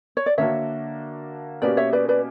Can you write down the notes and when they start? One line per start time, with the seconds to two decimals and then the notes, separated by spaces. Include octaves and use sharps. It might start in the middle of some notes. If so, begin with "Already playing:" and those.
0.17 C#5
0.26 D5
0.38 D3 A#3 D4 F#4 A#4 C#5 E5
1.62 B2 A#3 C#4 G4 B4 D5
1.77 C#5 E5
1.93 B4 D5
2.09 B4 D5